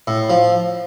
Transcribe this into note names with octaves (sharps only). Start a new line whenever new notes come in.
A2
F3